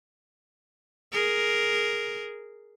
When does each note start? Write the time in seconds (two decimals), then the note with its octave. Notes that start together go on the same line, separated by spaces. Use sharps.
1.13 G#4 A#4